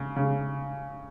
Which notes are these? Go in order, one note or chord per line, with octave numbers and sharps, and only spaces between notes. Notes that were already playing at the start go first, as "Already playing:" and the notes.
Already playing: C#3
C#3